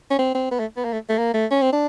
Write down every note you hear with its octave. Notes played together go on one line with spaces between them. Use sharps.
C#4
C4
C4
B3
A3
B3
A#3
A3
A3
A#3
A3
C#4
C4
D4